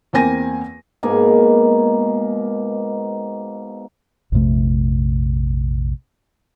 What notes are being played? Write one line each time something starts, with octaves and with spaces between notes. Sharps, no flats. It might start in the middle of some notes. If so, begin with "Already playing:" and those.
E2 A#3 C4 G#5 A#6 D#7
G#2 B2 A#3 G#5
A#1 F2 C3 A3